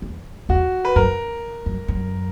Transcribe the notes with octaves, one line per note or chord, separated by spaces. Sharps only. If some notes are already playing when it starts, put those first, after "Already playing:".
E2
E2 F#4
B4
F#2 A#4
F#2
F#2